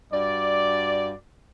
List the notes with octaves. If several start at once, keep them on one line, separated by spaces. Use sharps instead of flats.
G2 F#4 D5